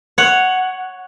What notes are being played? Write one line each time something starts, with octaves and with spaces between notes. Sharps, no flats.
C#5 F#5